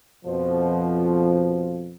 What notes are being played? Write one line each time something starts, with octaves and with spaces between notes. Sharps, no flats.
F2 B2 F3